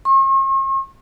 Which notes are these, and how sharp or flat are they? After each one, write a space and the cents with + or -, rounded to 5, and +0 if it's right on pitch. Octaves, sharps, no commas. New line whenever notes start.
C#6 -45